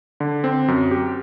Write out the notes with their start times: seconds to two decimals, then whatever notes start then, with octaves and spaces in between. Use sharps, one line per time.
0.20 D3
0.44 C4
0.68 F#2
0.91 G4